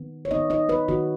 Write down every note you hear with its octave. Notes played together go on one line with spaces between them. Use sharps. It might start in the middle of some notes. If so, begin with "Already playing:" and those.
Already playing: D#3 B3
C#5
D#3 B3 D#4 D#5
D#4 D#5
B3 B4
D#3 B3 F#4